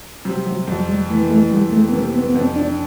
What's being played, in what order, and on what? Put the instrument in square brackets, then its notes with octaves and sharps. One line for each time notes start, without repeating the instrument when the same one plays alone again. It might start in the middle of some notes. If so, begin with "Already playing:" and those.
[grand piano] C3 [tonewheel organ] F#3
[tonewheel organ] F#3
[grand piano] F2 [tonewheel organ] F#3
[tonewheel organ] G3
[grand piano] E3 [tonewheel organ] A3
[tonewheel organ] A3
[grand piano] F2 [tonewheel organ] G3
[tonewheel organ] A3
B3
[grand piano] C3 [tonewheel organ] A#3
[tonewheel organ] B3
B3
[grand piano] F2 [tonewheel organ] C4
[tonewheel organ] D4